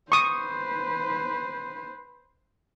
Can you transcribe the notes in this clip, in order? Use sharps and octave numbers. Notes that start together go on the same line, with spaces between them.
B4 C5 C#6 D#6